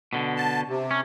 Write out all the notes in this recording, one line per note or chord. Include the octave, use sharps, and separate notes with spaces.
B2 D3
A5
C3
C#4